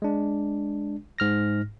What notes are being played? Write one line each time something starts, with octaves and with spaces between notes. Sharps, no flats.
G#3 D4
G#2 F6 A#6